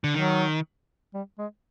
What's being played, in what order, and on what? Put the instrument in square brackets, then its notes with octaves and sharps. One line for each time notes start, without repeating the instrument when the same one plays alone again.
[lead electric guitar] D3
[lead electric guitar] D#3 [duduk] F#3
[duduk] G3
G#3